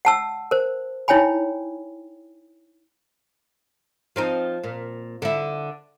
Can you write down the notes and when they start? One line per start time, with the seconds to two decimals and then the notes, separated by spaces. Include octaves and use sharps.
0.05 F#5 A5 E6
0.51 A#4 C5
1.08 D#4 E4 C#5 G5 G#5 B5
4.16 F3 C4 D#4
4.64 A#2
5.22 D3 E4